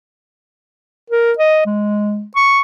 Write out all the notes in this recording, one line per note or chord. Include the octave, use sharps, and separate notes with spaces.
A#4
D#5
G#3
C#6